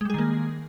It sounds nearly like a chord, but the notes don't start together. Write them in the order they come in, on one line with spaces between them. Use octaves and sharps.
G#3 G3 G#4 D#3 A#3